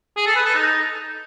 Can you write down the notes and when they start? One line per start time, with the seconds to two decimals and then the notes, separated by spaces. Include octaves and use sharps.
0.17 G#4
0.26 A4
0.36 B4
0.45 A4
0.54 D#4